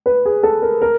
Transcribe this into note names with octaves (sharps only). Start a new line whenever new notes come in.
B4
G#4
A4
A#4
A#4